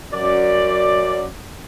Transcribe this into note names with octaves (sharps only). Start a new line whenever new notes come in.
F#2 D5